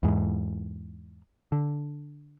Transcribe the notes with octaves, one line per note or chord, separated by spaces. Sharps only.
E2 G#2
D3